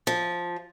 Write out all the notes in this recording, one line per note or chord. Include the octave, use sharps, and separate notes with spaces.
F3